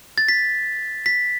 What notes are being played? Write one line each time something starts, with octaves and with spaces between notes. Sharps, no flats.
A6
B6
B6